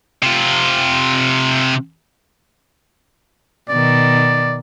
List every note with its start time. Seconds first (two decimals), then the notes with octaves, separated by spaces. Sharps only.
0.23 C3 F4
3.70 B2 D#3 D5